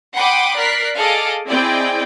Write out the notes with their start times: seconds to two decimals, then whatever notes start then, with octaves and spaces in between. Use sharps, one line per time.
0.15 F#5 G5 B5 C6 D6 D#6
0.57 A#4 D5 F#6 B6 C7
0.97 G#4 A4 D#5 F5 D6
1.48 C4 E4 G#4 D5 D#5 G5